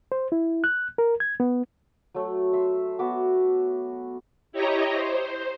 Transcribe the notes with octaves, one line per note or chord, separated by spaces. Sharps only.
C5
E4
F#6
A#4
G#6
B3
F#3 A3
E5 C6
B3 F#4 E5 D6
E4 G4 C#5 D#5 A#5
C5